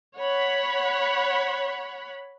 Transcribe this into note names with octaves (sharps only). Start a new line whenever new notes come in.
C#5 F#5 B5